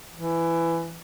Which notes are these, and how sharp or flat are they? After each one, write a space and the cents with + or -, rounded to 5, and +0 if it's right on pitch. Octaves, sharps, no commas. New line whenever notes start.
E3 +15